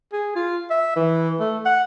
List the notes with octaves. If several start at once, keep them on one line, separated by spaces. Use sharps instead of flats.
G#4
F4
E5
E3
A3
F#5